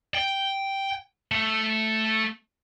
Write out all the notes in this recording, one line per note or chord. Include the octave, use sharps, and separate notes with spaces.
G5
A3